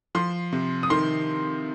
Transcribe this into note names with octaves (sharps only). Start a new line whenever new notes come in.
F3 C6
C3
D#6
D#3 C6